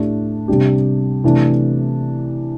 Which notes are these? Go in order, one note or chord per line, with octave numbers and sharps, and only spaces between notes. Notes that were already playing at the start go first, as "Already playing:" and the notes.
Already playing: A2 A3 D4 G4
C3 G3 D4 G4
C3 E3 A3 D4